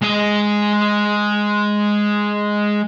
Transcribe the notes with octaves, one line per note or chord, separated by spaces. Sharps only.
G#3 D#5